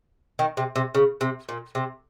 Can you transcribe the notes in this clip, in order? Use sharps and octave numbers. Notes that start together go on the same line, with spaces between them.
D#3
C3
C3
C#3
C3
A#2
C3